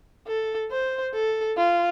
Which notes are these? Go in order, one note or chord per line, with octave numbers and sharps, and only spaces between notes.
A4
C5
A4
F4